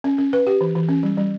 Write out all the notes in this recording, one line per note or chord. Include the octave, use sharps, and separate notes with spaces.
C#4
C#4
B4
G4
E3
E3
C#4
G3
G3